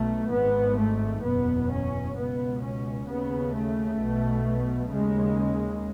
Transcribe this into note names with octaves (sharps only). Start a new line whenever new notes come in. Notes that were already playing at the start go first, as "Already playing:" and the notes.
Already playing: B1 B2 A3
G#1 G#2 B3
A3
F#1 E2 B2 B3
C#4
C#2 B2 B3
C#4
D#2 C#3 B3
A3
B1 B2
D#2 C#3 G#3